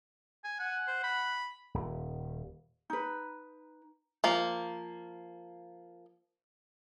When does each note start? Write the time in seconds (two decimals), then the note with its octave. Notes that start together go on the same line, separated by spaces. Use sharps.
0.44 G#5
0.60 F#5 G#5
0.87 C5
1.04 B5
1.74 D#1
2.90 D#4 B4
4.24 F3 A#3